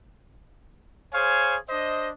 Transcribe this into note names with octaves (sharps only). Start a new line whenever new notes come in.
G#4 C5 C#5 F5 G#5
D4 C5 D#5